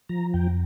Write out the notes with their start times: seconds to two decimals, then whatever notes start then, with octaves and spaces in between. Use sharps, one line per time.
0.09 F3 A#5
0.34 F2 G5